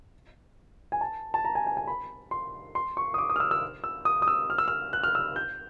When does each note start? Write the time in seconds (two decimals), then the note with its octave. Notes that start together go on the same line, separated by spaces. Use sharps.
0.92 G#5
1.01 A5
1.34 A5
1.45 A#5
1.55 G#5
1.67 G#5
1.77 G#5
1.87 B5
2.31 C6
2.75 C6
2.97 C#6
3.14 D#6
3.18 D6
3.30 D#6
3.36 F6
3.40 E6
3.51 E6
3.84 E6
4.05 D#6
4.22 D#6
4.28 E6
4.50 F6
4.58 E6
4.68 F6
4.93 F#6
5.03 F6
5.15 E6
5.36 G6